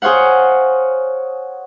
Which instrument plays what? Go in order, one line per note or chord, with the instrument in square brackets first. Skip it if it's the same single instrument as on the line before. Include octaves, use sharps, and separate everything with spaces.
[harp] G#4 C5 C#5 F5 F#5